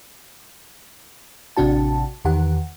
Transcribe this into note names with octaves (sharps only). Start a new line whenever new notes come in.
A1 C3 D4 F#4 A5
E2 D#3 G4 F#5